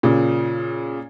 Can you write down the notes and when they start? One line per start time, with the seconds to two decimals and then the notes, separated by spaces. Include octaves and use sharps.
0.03 A#2 C#3